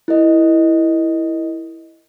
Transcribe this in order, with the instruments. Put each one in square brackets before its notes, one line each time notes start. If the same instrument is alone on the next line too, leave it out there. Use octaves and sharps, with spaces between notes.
[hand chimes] E4 A#4 D#5